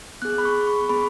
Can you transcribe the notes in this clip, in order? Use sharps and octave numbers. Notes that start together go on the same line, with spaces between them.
B3 G#4 F#6
B5
C#6
C#6
B3 G#4 B5